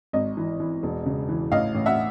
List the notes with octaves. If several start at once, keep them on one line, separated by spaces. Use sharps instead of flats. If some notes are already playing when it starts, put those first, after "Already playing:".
G#1 D#5
E3
E3
E1
C#3
E3
A1 D#5 F5
A1
E5 F#5